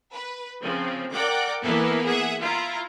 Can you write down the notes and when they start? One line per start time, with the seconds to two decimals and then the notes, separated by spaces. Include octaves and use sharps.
0.12 B4
0.61 C#3 F3 C4
1.13 A#4 D5 F#5 G5 D6
1.63 E3 A#3 B3 E4 A4 B4
2.07 G#4 E5 F#5
2.40 E4 F4 A#5